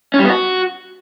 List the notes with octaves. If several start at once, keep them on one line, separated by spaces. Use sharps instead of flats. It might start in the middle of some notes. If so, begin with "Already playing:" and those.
C#4
G3
B3
F#4